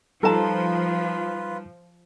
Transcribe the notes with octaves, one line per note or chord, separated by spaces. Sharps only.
F3 G3 D#4 F4 A4 B4 A5 A#5